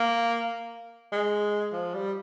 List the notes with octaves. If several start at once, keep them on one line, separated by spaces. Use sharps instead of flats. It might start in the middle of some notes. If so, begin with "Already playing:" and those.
Already playing: A#3
G#3
F3
G3